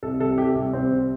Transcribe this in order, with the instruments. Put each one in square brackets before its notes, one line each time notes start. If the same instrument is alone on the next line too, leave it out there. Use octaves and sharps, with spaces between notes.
[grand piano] C2 A4
C3 A4
C2 G4
C2
C2 C4
C3